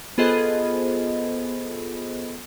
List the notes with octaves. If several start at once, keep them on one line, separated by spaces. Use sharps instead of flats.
B3 F4 G#4 A4 C5 D#5